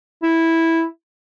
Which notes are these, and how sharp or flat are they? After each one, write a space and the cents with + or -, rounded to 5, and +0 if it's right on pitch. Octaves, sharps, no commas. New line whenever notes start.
E4 -5